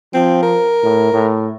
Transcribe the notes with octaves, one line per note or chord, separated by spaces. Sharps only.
F3 C4
A#4
A2
A2